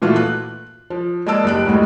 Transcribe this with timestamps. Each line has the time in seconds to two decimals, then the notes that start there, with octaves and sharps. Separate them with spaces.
0.02 A#2 E3 A3 F4 F#4
0.16 F#6
0.90 F3
1.27 G#3 A#3 D5 A5 E6 D7
1.44 F#1 G3 F#6 D7
1.65 F#1 D2 A2 G3 G#3